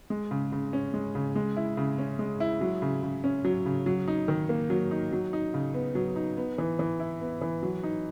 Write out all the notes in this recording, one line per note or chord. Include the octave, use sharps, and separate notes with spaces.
G#3
C#3
C#3
C#4
G#3
C#3
G#3
E4
C#3
C#4
G#3
E4
F#3
C#3
C#3
C#4
F#3
C#3
F#3
D#4
D#3
A#3
F#3
D#4
F#3
D#4
C#3
B3
F#3
D#4
B3
E3
E3
E4
B3
E3
F#3
D#4